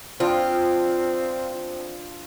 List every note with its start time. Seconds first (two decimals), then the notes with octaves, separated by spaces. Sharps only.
0.20 F3 C4 D4 F4 G5